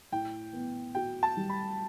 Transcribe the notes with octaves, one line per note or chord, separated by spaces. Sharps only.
A2 G5
B3
F#4 G5
A5
G3
B5